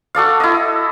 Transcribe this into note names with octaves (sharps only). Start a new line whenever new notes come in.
F#4 A4 D5 F5
E4 D#5